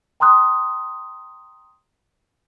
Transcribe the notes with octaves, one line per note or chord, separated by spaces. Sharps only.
G5 A#5 C6 D#6 F#6